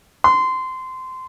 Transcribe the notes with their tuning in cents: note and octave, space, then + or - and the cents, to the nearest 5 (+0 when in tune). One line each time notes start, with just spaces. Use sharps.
C6 -20